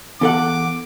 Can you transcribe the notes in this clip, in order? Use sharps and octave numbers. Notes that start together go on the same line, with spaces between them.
E2 B3 A4 F#5 D6